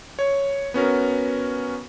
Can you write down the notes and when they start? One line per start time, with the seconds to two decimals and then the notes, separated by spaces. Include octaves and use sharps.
0.19 C#5
0.74 B3 C#4 F#4 A#4